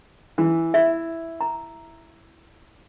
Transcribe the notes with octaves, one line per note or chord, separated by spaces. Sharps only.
E3
E4 E5
A#5